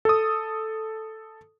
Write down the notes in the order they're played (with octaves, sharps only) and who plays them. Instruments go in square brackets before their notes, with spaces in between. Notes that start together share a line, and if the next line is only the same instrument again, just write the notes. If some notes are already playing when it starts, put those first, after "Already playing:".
[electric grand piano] A4 D#6